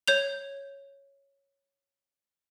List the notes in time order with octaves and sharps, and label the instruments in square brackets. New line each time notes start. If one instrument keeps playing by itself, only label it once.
[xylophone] C#5 G6 F7